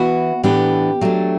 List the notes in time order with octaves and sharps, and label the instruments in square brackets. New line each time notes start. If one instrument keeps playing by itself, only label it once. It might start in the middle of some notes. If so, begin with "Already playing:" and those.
Already playing: [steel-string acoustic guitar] E3 B3 E4 F#4
A2 E3 B3 D4 G4
F#3 A3 D4